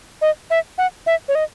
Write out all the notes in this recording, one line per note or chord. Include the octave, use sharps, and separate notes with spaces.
D#5
E5
F#5
E5
C#5
D#5